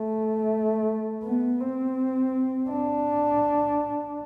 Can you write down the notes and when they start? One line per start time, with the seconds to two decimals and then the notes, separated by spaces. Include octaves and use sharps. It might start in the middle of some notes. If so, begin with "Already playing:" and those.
Already playing: A3
1.24 B3
1.60 C4
2.70 D4